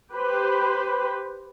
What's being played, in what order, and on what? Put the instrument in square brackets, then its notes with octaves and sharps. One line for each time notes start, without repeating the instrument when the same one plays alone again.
[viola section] G4 B4 C5